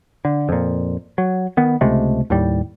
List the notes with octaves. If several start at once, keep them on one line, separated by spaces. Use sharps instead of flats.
D3
F2 A#2
F#3
D#3 B3
C#2 C3 G#3 A3
D#2 A2 G3